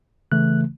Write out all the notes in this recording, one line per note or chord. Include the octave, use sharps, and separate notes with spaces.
C#3 E3 A3 F#6